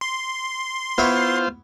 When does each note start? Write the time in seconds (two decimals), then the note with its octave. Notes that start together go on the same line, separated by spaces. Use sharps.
0.01 C6
0.98 B3 E4 F4 C5 C#5